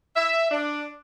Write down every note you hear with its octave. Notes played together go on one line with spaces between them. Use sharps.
E5
D4